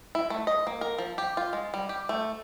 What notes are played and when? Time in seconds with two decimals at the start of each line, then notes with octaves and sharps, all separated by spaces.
0.15 E4
0.30 A3
0.47 D#5
0.67 A#3
0.81 A#4
0.98 F3
1.18 G4
1.37 F4
1.53 G#3
1.74 G3
1.89 G4
2.09 A3